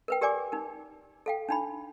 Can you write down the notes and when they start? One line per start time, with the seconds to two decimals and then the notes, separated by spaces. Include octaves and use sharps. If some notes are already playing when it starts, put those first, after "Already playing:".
0.08 A#4 B4 G5
0.21 G4 A#4 D5 G#5 D6
0.52 D#4 A#4
1.26 A4 F5 G5
1.49 D4 D#4 B5